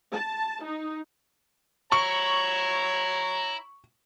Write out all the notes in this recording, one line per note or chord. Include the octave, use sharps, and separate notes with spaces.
A5
D#4
E4 C#5 A#5 C#6